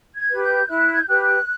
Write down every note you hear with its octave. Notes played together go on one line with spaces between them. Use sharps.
G#6
G4 B4
G6
E4 F#6
G#6
G6
G4 B4 F#6